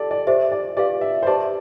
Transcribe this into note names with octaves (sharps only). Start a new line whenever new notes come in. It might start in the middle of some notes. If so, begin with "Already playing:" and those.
Already playing: G4 A4 D5
D5
G4 C5 D5 E5
D5
G4 B4 D5 F5
E5
C5
G4 B4 D5 E5 A5